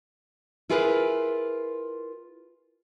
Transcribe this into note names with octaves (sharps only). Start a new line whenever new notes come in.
E4 F4 G#4 A#4 B4